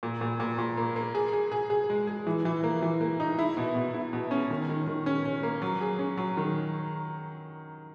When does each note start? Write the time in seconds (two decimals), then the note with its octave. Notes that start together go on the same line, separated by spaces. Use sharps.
0.03 A#2
0.21 A#2
0.40 A#2
0.59 A#2
0.77 A#3
0.96 A#3
1.15 G#4
1.33 G#4
1.52 G#4
1.70 G#4
1.90 G#3
2.07 G#4
2.27 E3
2.45 E3
2.64 A#3
2.82 E3
3.01 A#3
3.20 D#4
3.39 E4
3.57 B2
3.75 B2
3.94 E4
4.13 B2
4.31 C#4
4.50 D#3
4.69 D#3
4.87 D#3
5.06 C#4
5.25 C#4
5.43 A#3
5.62 F#3
5.81 G#4
5.99 C#4
6.17 F#3
6.37 D#3